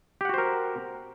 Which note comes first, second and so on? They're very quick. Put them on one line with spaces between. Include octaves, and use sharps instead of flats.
G4 F#5 F#4 C5 A#4